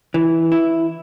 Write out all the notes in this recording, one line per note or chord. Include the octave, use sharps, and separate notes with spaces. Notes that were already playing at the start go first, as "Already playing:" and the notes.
E3
E4